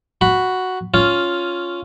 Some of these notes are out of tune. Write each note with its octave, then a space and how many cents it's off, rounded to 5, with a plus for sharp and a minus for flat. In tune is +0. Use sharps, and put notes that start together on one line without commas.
F#4 +0 B5 +5
C#4 +5 F4 +0